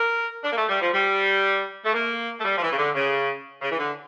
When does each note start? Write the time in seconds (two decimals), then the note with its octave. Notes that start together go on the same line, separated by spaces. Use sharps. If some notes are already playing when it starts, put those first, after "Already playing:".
Already playing: A#4
0.43 D4
0.52 A#3
0.56 A3
0.69 G3
0.81 F3
0.93 G3
1.85 A3
1.94 A#3
2.39 A3
2.45 G3
2.57 F3
2.62 E3
2.72 C#3
2.78 D3
2.95 C#3
3.62 C#3
3.71 E3
3.79 D3